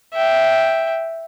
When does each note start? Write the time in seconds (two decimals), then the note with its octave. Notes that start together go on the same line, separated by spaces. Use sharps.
0.14 E5 G5